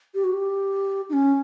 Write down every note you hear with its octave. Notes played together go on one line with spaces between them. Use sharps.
G4
F#4
G4
D#4
C#4